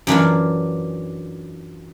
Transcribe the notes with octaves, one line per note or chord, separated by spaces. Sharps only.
F#2 E3 D4 F4